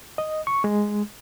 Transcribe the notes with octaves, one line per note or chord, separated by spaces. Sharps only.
D#5
C#6
G#3